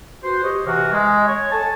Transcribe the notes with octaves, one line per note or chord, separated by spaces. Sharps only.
F#4 B4 C5
G4 C5 C#5 D#5
C3 E3 F#4 A#4
G#3
C#5
A4 G#5 A5